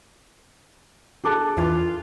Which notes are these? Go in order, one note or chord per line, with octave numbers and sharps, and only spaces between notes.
D4 G#4 A4 D6 F#6
E2 E3 F4